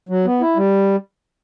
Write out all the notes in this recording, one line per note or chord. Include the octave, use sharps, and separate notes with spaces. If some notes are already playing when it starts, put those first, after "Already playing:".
F#3
B3
E4
G3